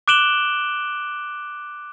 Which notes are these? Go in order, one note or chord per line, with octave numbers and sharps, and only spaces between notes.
D6 F#6 D7 E7 F#7 G7